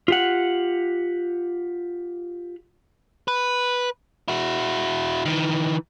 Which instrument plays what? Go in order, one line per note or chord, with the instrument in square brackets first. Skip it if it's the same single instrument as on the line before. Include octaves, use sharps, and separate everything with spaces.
[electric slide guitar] F4 G4 F#5
[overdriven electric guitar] B4
E4 F#4
D#3 E3